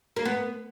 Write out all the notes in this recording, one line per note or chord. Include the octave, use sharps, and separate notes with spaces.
A#3
B3